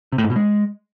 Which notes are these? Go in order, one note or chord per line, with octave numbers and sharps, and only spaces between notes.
C3
A2
G#2
B2
G#3